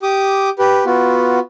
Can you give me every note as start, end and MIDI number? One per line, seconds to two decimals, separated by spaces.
0.03 0.50 67
0.03 0.50 86
0.03 0.50 87
0.59 0.84 67
0.59 0.84 71
0.86 1.39 59
0.86 1.39 65
0.86 1.39 66